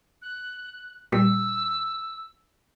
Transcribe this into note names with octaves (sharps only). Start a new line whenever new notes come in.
F#6
A#2 G3 E6